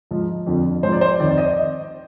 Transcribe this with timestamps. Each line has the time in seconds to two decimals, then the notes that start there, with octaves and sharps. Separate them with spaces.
0.11 G#2 F3
0.46 F2 D3 F3
0.83 G#2 F3 C5
0.93 D5
1.01 C5
1.19 F2 D#3 D5
1.31 D5
1.38 D#5